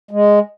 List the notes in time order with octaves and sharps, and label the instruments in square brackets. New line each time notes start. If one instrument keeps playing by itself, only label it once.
[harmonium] G#3